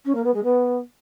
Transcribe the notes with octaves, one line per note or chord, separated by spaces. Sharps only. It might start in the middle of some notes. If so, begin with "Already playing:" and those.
C#4
A#3
B3
G#3
B3